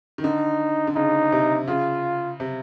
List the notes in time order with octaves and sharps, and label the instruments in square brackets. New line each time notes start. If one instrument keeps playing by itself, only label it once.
[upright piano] D#3
[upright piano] D3 [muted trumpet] D#4
[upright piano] D3
[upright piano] C#3 [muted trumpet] D#4
[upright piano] C3
[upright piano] C#3 [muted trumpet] F4
[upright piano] C3